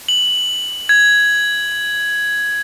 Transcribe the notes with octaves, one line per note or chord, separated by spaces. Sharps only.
F#7
G#6